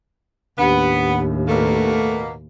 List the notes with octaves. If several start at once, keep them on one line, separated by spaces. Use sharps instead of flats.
D#2 A2 B3 D4 G4
B2 A3 A#3